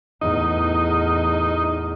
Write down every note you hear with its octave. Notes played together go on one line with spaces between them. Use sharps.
E2 A2 D#4